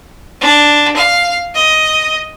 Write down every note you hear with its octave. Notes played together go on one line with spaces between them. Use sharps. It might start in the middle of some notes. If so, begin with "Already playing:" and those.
D4
F5
D#5